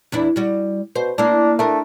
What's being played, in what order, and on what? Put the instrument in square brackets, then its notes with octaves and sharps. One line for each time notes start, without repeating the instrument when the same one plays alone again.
[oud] E2 D4 E4
G3 F#4
[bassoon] B2 [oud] C5
[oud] A#3 E4 [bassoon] D4
[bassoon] A3 [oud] D4 A#4